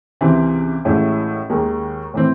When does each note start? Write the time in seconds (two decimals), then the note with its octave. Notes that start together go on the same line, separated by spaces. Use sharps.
0.21 C#2 C3 E3 C4
0.85 A1 A2 G#3 C#4 E4
1.50 D#2 D#3 G#3
2.14 A2 E3 C4